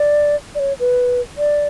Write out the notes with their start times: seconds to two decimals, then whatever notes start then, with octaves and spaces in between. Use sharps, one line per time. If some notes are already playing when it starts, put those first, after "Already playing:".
Already playing: D5
0.55 D5
0.60 C#5
0.80 B4
1.38 D5